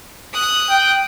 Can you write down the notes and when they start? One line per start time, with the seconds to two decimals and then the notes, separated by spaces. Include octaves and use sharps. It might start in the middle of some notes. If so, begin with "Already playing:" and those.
0.34 D#6 F#6
0.70 G5